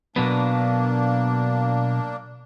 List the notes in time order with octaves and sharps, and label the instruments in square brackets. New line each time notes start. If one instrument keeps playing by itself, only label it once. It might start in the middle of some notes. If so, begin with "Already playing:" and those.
[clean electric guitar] B2 F#3 B3 [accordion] A#3 D4